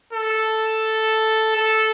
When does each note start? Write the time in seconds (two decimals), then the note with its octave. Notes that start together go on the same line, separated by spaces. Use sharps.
0.13 A4
1.57 A4